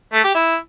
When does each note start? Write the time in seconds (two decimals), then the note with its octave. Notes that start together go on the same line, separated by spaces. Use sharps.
0.13 A3
0.24 G4
0.35 E4